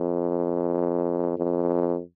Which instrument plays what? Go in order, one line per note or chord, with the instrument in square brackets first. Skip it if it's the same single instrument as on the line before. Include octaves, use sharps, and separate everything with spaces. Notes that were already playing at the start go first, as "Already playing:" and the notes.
Already playing: [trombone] F2
F2